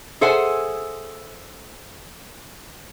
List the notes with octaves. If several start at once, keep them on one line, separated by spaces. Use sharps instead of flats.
G#4 A4 C5 E5 F#5 G#5